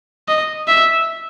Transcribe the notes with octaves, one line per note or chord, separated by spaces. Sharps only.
D#5
E5